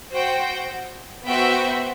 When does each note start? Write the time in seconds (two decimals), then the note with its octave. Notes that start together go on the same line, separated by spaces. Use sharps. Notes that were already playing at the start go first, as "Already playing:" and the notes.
0.11 F#4 C5 G5
1.27 B3 F#4 C5 E5 G5